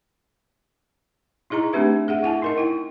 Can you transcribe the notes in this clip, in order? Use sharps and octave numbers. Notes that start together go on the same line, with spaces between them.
D#4 E4 G#4 D#5 A#5
A3 C4 D4 G4 B4 E5
G#4 E5 F#5
E4 F#5 G#5 A5
D#4 A#4 D#5
E4 G5